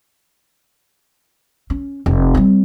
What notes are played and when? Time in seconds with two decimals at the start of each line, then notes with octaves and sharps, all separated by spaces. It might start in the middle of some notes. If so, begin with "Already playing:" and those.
1.70 C#4
2.06 F1
2.35 G3 C4